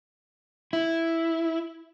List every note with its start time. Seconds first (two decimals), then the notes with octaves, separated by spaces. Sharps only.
0.73 E4